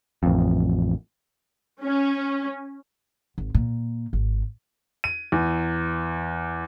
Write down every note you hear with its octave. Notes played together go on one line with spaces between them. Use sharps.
A1 F2
C#4
G#1
A#2
G#1
D#7
E2